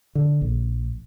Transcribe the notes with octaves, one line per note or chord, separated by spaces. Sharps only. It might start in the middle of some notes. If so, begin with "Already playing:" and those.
D3
A#1